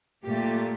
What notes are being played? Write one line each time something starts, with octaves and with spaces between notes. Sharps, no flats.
A#2 A3 G4